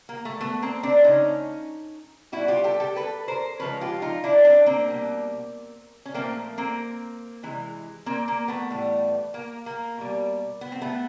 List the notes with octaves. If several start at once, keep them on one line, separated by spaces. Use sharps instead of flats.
A#3
A3
A3 B3
A#3 C4
C4 D4
C#3 F3 A3 C#4 D#4
B2 G3 E4 F#4
F4 G4
G4 A4
G4 A4
A4 B4
A#4 C5
C#3 F3 G#3 B4 C#5
F4 G4
D#4 F4
D4 E4
C4 D4
A#3 C4
B2 G3
C#4
A#2 F3 A3 A#3 C4
A#3 C4
C3 E3 G#3
A#3 C4
A#3
A3 B3
A2 E3 G3
A#3
A#3
B2 G3
B3
C4
A3 B3